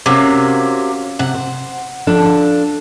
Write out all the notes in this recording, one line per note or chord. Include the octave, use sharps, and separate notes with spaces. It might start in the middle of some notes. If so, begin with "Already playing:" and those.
C3 F#3 A#3 C#4 F4
C3 F#5
C5
F3 D4 A4